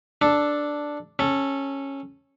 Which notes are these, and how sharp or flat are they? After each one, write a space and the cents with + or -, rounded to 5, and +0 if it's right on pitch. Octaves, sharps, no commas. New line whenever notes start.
D4 +0 A4 +0
C#4 -10 A4 +0